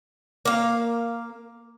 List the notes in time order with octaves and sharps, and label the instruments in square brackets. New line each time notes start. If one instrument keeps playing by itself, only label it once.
[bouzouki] A#3 F5